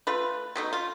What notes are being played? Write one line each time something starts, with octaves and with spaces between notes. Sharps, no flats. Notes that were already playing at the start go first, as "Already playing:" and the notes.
A3 F4 B4
B2 A3 D#4
F4